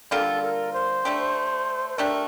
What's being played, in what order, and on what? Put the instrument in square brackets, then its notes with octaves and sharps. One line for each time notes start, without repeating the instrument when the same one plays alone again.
[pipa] D3 G3 A#3 F4 [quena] A4
[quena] A#4
C5
[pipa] A3 D4 G4
[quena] C5
[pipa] A3 D4 G4 [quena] A#4